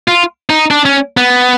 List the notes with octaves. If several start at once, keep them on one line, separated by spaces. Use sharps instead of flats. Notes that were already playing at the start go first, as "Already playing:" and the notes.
F4
D#4
D4
C#4
B3